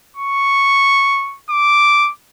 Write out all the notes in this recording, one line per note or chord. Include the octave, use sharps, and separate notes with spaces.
C#6
D6